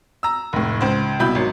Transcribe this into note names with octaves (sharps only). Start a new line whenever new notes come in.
A#5 E6
F1 A2
C#2 C5
C2 B2 E4 B5 G6
G#1 F#3